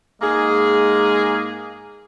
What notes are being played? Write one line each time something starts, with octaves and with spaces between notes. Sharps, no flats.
G#2 G#3 A#3 G#4